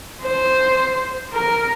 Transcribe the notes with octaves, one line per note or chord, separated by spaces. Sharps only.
C5
A#4